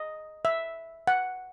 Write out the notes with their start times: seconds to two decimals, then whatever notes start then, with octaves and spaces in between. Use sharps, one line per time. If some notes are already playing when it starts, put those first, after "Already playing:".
Already playing: D#5
0.45 E5
1.07 F#5